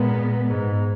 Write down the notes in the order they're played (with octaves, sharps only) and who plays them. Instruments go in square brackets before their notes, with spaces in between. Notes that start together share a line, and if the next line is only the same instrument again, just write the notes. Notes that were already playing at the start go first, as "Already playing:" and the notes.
Already playing: [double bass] A#2 [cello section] G#3 B3
[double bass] G#2